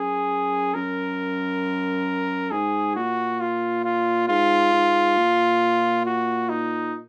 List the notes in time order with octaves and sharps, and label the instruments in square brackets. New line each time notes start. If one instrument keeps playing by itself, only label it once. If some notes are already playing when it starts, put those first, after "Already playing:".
Already playing: [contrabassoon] F#2 [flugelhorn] G#4
[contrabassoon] F#2 [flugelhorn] A#4
[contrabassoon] G#2 [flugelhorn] G#4
[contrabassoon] A#2 [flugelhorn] F#4
[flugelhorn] F4
F4
[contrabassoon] G#2 [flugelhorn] F4
[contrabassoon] G#2
A#2
[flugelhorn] F#4
D#4